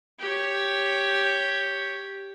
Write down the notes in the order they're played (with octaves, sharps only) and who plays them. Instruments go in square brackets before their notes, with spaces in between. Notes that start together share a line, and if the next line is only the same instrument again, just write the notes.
[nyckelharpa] G4 C#5